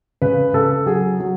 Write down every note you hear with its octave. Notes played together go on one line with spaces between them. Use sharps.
C#3 B4
C#3 A4
F#3 G#4
F#3